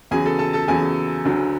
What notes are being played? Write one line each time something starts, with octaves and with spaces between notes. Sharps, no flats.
E2 C#3 F#3 G#4 G#5
A4 A5
A4 A5
A4 A5
E2 C#3 F#3 G#4 G#5
D2 D3 F#3